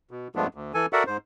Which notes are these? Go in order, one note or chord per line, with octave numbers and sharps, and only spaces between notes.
B2
G2 F3 G#3 A3 B3 D4
D2
E3 A4 G#5
F#4 A4 A#4 D5 E5 F#5
G#2 C5